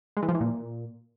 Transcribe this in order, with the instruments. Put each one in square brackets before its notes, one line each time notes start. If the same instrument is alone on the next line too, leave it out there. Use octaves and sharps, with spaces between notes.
[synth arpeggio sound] G#3
E3
F3
E3
A#2